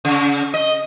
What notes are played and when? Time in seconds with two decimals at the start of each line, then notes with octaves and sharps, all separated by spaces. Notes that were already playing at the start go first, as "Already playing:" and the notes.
0.05 C#3
0.54 D#5